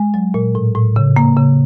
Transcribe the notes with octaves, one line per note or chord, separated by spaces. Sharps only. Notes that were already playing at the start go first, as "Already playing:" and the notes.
Already playing: G#3
F#3
A#2
A2
A2
C#3
A#3
C#3